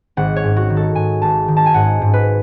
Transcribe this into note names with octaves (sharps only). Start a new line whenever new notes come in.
G#1 F#5
C#5
G#2
F#4
D#3
A4
G#2 G#5
G#1 A5
D#3
A5
G#5
G#2 F#5
G#2
B4